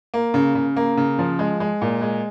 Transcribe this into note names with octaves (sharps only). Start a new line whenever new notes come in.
A#3
C#3
C#3
A#3
C#3
F3
G#3
G#3
A#2
G#3